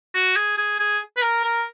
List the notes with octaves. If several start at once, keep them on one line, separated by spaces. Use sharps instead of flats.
F#4
G#4
G#4
G#4
B4
A#4
A#4